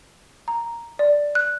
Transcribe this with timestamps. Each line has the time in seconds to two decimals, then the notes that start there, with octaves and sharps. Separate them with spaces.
0.48 A#5
0.99 D5
1.35 F#6